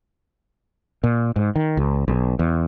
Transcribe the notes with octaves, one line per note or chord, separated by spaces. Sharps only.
A#2
G#2
D#3
C#2
B1
E2